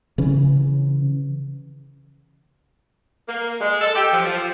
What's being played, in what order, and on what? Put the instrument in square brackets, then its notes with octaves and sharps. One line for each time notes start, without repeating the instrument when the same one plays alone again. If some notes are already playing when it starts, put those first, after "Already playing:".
[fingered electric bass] C#3 E3 C#4
[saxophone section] A#3
G#3
A4
G4
F3
F3